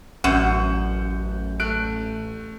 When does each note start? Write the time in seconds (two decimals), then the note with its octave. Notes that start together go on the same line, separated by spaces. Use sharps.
0.24 A1 F#2 F#5 G6
1.60 A3 F#6 D7